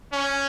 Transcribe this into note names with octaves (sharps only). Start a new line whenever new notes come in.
C#4